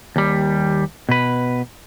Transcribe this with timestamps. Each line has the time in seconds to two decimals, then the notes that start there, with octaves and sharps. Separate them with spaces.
0.16 D#2 G3
1.09 B2 B4